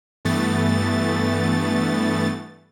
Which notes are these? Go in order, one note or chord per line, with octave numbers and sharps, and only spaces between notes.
G2 E3 A3 B3 A6